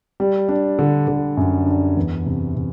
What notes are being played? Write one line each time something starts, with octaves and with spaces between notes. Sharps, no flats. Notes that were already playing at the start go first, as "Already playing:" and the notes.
G3
D4
D3
D3
F#2
D4
E2
C3
C3